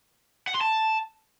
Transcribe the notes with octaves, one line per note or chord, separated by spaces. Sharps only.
F#5
C6
A5